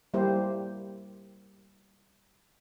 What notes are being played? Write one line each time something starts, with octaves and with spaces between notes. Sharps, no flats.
G3 A#3 E4 G4 C5